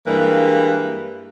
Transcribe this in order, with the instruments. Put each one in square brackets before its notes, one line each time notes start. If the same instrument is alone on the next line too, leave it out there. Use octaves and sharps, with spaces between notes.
[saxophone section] G2 E3 G3 G#3 A#3 B4